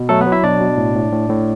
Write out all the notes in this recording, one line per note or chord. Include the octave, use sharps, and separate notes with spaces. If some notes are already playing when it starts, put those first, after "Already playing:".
Already playing: B2
F#3 A3 A4
B3 B4
F#3
E4 E5
B2 D4 D5
B2
A2
A2
A2
A2